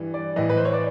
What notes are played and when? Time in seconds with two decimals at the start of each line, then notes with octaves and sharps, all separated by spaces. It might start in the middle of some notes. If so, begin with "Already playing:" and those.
Already playing: G2 E3
0.14 D5
0.36 A2 E3 D#5
0.49 B4
0.57 C5
0.65 C#5
0.73 D5